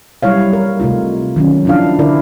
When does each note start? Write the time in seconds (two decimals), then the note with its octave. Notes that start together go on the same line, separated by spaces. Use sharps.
0.23 F#3 G3 E4 C#5 F5
0.53 A#4
0.80 C3 A3 D#4 F4
1.36 D#3 F#3 C#4
1.65 F3 F#3 D4 E4 F5
1.99 D3 E4 A#4 D5